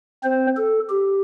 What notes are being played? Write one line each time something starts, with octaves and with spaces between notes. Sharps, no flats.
C4 C5
A4
G4